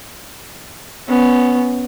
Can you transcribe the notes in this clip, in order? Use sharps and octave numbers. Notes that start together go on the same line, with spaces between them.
B3 C#4